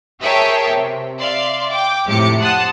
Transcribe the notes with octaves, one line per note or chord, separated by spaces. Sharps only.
G#4 A#4 C#5 E5 G5 A5
C3
D5 E5 F5 C6
G5 D6
F2 A2 C3 G4 D6 C#7
F#5 A5 C6 D#6 F#6